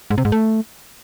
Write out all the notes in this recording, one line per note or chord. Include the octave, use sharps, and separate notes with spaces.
G#2
C3
G#2
A3